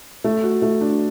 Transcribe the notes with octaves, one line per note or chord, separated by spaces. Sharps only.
A3
F#4
A3
D4